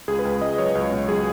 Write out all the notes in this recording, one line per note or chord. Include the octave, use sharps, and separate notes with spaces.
C#2 G#4
B4
C#2
C#2 D#5
F#3 C#5
C#2
B2
F#3 G#4